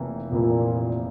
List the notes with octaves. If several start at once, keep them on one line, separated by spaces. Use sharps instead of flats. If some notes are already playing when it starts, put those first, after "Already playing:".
Already playing: F1 F2 E3 A#3 E4
F1 F2 A#2 E3 A#3 E4